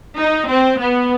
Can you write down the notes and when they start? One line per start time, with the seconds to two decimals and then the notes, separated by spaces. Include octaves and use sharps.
0.19 D#4
0.49 C4
0.79 B3